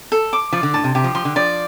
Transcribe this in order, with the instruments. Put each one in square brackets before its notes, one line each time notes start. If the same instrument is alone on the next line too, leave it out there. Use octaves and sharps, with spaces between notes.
[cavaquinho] A4
D6
[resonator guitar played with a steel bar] F3 [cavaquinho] D5
[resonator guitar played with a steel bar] D3
[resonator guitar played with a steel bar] A2 [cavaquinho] A5
[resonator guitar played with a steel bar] C3
[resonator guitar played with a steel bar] C3 [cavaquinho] G4
[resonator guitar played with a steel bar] F3
[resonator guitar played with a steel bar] F3 [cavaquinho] C6
[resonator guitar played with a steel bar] D3
[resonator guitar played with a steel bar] F3 [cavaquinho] D5